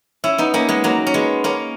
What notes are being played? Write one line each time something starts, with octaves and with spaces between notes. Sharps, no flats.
C#4 E4
B3 D#4
A#3 C#4
G#3 B3
F#3 A#3
C#4
G#3 B3
A#3 C#4